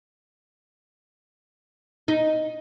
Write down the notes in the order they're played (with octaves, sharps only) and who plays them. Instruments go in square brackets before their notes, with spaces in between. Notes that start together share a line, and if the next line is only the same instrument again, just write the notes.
[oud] D#4